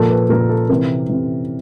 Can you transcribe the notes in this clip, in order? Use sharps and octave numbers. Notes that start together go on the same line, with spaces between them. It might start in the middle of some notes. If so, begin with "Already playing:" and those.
Already playing: A#2 F3 A4
B4
A#2 F3 A#4
A4
C3 E3 A#4
C3 E3